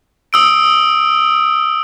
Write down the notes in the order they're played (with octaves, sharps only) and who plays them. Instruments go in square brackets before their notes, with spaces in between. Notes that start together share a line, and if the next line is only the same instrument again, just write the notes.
[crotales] D#6 E6 D7